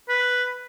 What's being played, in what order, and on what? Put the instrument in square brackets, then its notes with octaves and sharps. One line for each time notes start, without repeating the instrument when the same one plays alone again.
[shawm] B4